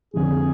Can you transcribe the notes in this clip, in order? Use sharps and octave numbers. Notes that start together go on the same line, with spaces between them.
F2 D3 F3 G#3 G#4